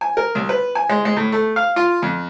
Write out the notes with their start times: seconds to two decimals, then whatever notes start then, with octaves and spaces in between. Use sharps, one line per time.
0.01 G#5
0.17 A#4
0.35 C2
0.49 B4
0.75 G#5
0.90 G#3
1.05 G#3
1.16 A2
1.32 A3
1.56 F5
1.76 F4
2.02 F2